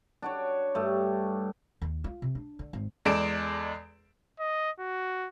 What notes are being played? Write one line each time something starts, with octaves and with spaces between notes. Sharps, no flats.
D4 F#4 C#5
G2 A3
D#2
F4
C3
D4
D3
G#1
E2 G#3 A4 D5 D7 E7
D#5
F#4